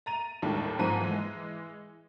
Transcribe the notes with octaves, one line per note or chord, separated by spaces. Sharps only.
A#5 A6 D#7 F7
D#2 A2 D#3 G3 G#3 D4
G#2 F3 C4 G#5 A#5 D#7
E3 G#3